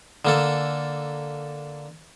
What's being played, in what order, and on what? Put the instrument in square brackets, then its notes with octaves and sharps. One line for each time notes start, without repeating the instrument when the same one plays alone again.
[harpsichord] D3 A#3 A4